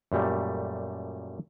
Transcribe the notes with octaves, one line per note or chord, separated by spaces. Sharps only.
F#2 A#2 G3 A3